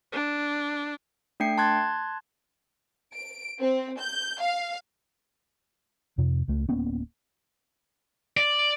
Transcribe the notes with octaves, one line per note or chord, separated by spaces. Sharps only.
D4
A3 D4 G5 C7 C#7
A5 C6 F#6 G#6 A6
D7
C4
G6
F5
F2 C3
C#2 A3
D1 A#3 B3 C#4
D5